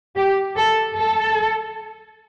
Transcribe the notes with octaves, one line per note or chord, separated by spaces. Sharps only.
G4
A4
A4